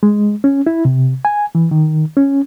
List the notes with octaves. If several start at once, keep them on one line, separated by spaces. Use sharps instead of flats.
G#3
C#4
E4
C3
G#5
E3
D#3
C#4